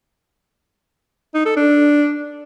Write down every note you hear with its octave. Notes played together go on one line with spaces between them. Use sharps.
D#4
A4
D4